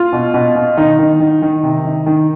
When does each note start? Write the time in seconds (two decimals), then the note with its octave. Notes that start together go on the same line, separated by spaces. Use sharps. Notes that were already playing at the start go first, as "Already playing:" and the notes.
Already playing: F4
0.13 B2
0.34 B2
0.55 B2
0.77 D#3 D#4
0.99 D#3
1.20 D#3
1.42 D#3
1.63 C3
1.85 D#3
2.06 D#3